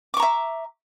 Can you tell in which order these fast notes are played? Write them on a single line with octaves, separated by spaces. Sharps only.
D6 C#6 A#5 E5